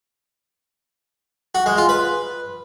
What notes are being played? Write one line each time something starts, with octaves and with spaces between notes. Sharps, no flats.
F#4
G#3
F4
B4